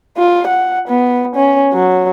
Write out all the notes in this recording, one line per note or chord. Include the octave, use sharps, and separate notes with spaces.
F4
F#5
B3
C#4
F#3